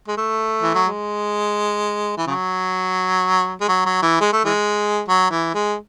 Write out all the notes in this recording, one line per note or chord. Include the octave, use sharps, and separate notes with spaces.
G#3
A3
E3
F#3
G#3
E3
C#3 F#3
G#3
F#3
F#3
E3
G#3
A3
E3 G#3
F#3
E3
G#3